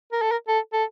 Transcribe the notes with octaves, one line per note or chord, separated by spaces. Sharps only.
A#4
A4
A#4
A4
A4